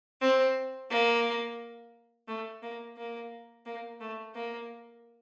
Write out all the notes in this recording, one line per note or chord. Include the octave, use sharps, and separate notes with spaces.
C4
A#3
A3
A#3
A#3
A#3
A3
A#3